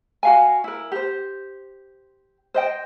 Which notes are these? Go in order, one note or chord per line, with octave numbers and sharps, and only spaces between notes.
F#4 F5 G#5
E4 A#4
G4 C5
C5 D#5 G5